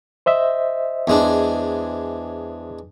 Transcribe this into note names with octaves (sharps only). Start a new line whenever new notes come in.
C5 D#5 E5
E2 G#3 D4